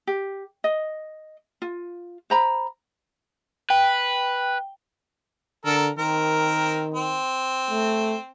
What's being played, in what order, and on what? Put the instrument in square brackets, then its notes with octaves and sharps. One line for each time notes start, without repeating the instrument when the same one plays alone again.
[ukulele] G4
D#5
F4
C5 A#5 B5
[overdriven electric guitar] B4 [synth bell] G5
[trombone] D3 [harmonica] A4 A#4
[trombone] D#3 [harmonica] C4 A#4
[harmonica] C4
[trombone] A3